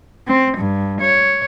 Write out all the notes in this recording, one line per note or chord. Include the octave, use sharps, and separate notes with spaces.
C4
G2
C#5